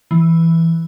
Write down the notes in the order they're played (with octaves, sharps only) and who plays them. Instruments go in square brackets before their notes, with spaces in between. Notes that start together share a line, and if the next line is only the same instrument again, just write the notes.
[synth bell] E3